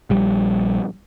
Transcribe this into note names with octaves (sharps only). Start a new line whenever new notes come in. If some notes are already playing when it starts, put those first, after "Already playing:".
A#1 G3